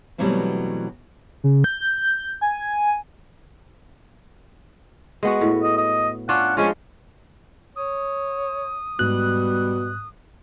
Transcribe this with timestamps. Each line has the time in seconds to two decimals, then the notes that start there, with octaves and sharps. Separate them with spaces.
0.18 B2 E3 F#3 G3 A3 C4
1.44 C#3
1.64 G6
2.41 G#5
5.23 G#3 B3 F#4
5.41 A2
5.62 D#5
5.77 D#5
6.29 C#4 D4 F4 F#5
6.57 F3 G#3 C#4 F4
7.76 C#5 D#6
8.99 G#2 B2 G3 F#6